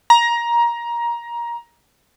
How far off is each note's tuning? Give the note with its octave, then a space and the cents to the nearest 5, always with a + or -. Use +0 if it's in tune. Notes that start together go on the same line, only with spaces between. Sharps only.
A#5 +20